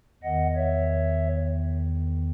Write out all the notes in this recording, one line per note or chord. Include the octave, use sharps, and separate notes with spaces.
E2 D#3 D#5 F#5
C#5 E5